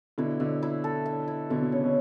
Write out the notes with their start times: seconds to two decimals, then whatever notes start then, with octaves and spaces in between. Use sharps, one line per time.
0.18 B2 D3 E4
0.40 B2 D3 E5
0.63 E4
0.84 A4
1.06 E5
1.28 E4
1.50 B2 D3 E5
1.61 B2
1.72 C#3 C#5
1.84 B2